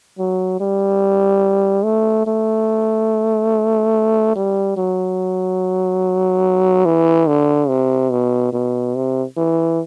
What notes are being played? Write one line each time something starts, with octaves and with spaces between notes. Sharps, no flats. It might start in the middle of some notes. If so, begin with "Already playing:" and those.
F#3
G3
A3
A3
G3
F#3
E3
D3
C3
B2
B2
C3
E3